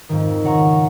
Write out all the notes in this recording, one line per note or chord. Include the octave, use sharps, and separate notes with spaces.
F2 G#2 D#3
C#3 F#5 A#5 C#6